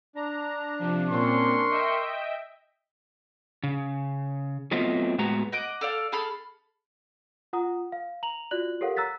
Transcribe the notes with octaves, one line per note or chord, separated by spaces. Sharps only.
D4 A#5
C3 F3
A#2 C4 C#4 A#4 C6 C#6
D#5 E5 G5
C#3
F#3 A3 B3 C4 F4 D#5
A2 G#3 B3 F#4 A#5
D#5 F#5 D6
A4 D5 F5
G#4 A4 B5 F6
F4 F#5 A#5 D#6
F5
A#5 F7 F#7
F4 F#4 D5 F#6 F#7
G4 A4 A#4 C#5 F5 F#5
A#5 E6 F#6 A6 B6